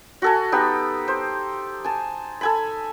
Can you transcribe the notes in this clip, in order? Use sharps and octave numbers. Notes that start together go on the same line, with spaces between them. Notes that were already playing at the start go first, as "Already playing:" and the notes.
F#4 A4 G#5
B3 D#4 G4
C5
G#5 A5
A4 G#5 B5